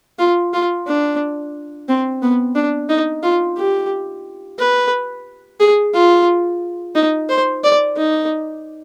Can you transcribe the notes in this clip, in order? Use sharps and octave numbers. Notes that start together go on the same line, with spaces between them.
F4
F4
D4
C4
B3
D4
D#4
F4
G4
B4
G#4
F4
D#4
C5
D5
D#4